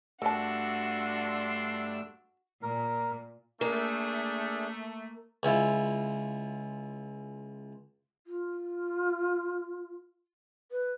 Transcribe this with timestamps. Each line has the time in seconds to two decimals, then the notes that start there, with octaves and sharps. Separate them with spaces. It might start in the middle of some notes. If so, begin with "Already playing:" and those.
0.22 G2 A3 D4 F#4 A#4 A5 C6 E6
2.63 A#2 A#4
3.61 A3 A#3 D4 G#4 A#4
5.43 C#2 C#4 E4 F4
8.27 F4
10.72 B4